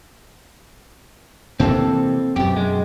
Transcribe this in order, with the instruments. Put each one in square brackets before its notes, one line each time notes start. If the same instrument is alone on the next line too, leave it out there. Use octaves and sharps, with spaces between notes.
[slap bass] C3 E3 A#3 [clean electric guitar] C4 A4
[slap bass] F#2 B2 [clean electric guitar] G4
[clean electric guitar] G#3